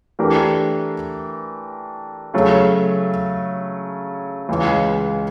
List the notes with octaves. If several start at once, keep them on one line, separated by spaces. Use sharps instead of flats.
E3 A3 D4 G4 A#4
C#3 F#3 A3
C#2 C#3 E3 G#3